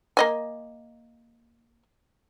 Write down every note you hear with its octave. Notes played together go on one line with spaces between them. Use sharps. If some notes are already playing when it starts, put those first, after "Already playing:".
A#3 D#5 G#5